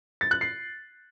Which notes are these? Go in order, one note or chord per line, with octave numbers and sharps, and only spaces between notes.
A6
F#6
C7